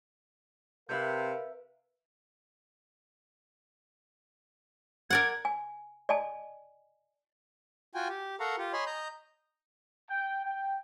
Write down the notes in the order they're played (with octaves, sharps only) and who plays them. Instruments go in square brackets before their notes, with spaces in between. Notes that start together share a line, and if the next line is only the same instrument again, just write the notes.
[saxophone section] C3 [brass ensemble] A#4 F5 [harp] B4 E5 G6
[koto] A#4 D5 F#5 [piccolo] G#6
[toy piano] G#5
D5 D#5 G#5 A5
[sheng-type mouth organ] F4 F#4 G5 G#5
G4
A4 A#4 F5 F#5 A#5 C#6
F4 G4
C#5 D#5 G#5 B5 C6
D#5 A#5 G6
[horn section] G5
G5